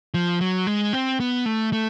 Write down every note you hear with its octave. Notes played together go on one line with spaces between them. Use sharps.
F3
F#3
G#3
C4
B3
A3
A3